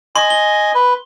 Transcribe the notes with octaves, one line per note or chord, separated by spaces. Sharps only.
D#5 G#5 C6
G7
B4